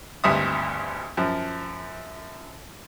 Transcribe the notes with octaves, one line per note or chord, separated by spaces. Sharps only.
G#1 D2 G2 E5 D#6
F#2 F3